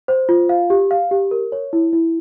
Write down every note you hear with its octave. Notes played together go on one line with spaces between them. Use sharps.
C5
F4
F5
G4
F5
G4
A#4
C#5
E4
E4